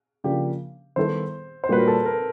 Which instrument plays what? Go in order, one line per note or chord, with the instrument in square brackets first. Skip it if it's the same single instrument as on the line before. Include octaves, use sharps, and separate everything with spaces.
[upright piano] C#3 F3 A#3 D4 G4
[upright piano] D#3 G3 B3 E4 A4 [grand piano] C5
[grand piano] C5
[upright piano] A#2 G3 A#3 D4 F#4 [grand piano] B4
[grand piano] A#4
A4
A#4